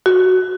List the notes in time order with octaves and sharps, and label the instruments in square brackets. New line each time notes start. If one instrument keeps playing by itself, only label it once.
[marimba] F#4